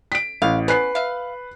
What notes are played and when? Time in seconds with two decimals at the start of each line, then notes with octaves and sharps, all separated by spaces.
0.12 B6 D7
0.42 A1 F5
0.68 B3 C#4 B4 F#6 C7
0.95 E5 F5